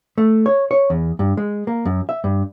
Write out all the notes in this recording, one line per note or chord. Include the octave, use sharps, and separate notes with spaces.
A3
C#5
C#5
E2
G2
G#3
A#3
F#2
E5
G2